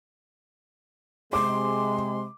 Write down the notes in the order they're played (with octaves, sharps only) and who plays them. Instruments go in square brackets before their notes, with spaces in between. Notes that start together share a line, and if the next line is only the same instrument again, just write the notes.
[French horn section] C3 G#3 [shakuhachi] C6 [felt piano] D6